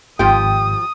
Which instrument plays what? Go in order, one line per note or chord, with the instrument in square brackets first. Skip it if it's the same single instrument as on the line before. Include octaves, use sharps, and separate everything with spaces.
[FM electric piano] G#1 [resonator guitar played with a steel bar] F3 F4 G5 [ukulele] G4 [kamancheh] D#6